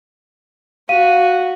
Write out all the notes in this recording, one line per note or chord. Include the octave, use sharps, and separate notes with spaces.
F#4 F5 D#7